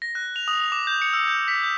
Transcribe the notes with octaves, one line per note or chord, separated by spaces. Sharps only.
A#6
F#6
F7
D#6
F7
D6
G6
C#7
E6
G6
B6
G6